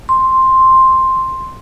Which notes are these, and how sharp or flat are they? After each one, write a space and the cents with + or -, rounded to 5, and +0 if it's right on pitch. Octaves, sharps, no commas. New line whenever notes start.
C6 +5